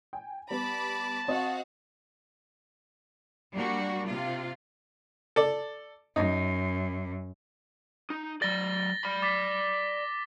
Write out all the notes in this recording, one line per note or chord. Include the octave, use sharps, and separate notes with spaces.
G5 G#5
G3 B3 A5 B5 D6
C4 F#4 C5 D#5 F5 F#5
G3 A#3 D4 F#4
C3 F4
A4 D5
F#2 D#4
D#4
F#3 D5 A6 A#6 G7
D5 B5
D6 A6 B6